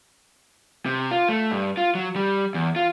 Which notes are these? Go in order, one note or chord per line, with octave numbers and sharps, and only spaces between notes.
C3
F4
A3
G2
F4
F#3
G3
E2
F4